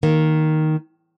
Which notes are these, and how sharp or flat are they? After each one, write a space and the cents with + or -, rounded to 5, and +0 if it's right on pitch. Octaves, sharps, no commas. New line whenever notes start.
D#3 +0 A#3 +0